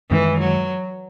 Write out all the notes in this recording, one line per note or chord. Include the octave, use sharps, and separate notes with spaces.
F#2 D#3 E3 G#3
F#3